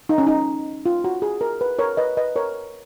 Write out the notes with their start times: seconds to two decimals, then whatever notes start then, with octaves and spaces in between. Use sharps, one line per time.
0.09 D#4
0.18 C#4
0.27 D#4
0.86 F4
1.04 F#4
1.22 G#4
1.41 A#4
1.61 B4
1.79 A#4 C#5
1.97 B4 D#5
2.17 B4 D#5
2.36 A#4 C#5